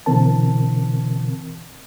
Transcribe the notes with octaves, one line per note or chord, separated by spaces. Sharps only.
B2 D3 E3 C4 A#4 A5